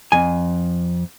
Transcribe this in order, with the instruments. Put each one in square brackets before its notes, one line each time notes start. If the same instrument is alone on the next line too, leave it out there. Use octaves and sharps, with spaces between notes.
[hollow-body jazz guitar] F2 G#5